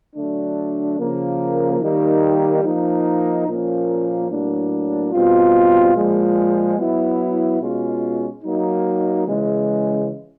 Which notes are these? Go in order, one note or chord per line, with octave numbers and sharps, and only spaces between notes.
D3 F#3 A3 D4
C#3 F3 A#3
D#3 G3 A#3 D#4
F3 A#3 D#4
A#2 F3 A#3 C#4
A2 F#3 A#3 D4
B2 G3 C4 F4
A#2 F3 G#3
F#3 B3 E4
B2 G#3 C#4 F4
F#3 A#3 D#4
C#3 E3 G#3